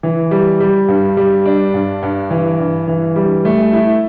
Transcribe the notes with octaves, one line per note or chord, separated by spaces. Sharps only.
E3
G3
G3
G2
G3
D4
G2
G2
E3
G2
E3
G3
A3
E4